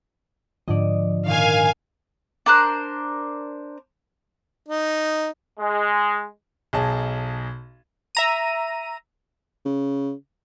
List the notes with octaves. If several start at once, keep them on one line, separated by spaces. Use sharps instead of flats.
G#2 D3 F3 D5 D#5
A#2 D#3 F5 G#5
D4 A#4 C5 F#6
D#4
G#3
B1 G#4 D#5 A5
E5 A#5 D#7
C#3